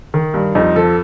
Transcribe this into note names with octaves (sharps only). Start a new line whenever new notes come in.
D#3
G2
F2 D#4
F3 A4